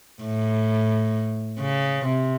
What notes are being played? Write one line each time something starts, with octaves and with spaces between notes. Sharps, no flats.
A2
C#3
C3